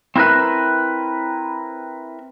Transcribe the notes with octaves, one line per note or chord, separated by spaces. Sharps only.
C4 E4 F#4 A#4 B4